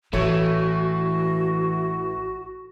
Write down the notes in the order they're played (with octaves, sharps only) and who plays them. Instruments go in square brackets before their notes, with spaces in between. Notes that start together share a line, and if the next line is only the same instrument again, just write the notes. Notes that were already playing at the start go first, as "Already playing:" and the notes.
[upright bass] A1 [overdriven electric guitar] E3 [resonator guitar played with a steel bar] A3 C#5 [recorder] F#4